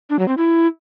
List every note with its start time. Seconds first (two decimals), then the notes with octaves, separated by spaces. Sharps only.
0.10 D4
0.19 F#3
0.28 C4
0.37 E4